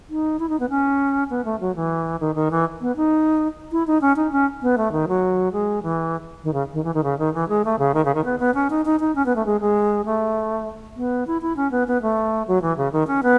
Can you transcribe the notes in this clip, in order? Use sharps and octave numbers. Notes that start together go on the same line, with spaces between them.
D#4
E4
D#4
B3
C#4
B3
A3
F#3
E3
D#3
D#3
E3
B3
D#4
E4
D#4
C#4
D#4
C#4
B3
A3
D#3
F#3
G#3
E3
D#3
C#3
D#3
E3
D#3
C#3
D#3
E3
G#3
A3
C#3
D#3
C#3
D#3
B3
B3
C#4
D#4
D#4
D#4
C#4
B3
A3
G#3
G#3
A3
B3
E4
E4
C#4
B3
B3
A3
F#3
E3
C#3
D#3
C#4
B3